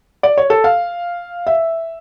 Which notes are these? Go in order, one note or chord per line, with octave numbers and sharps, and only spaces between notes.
D5
C#5
A4
F5
E5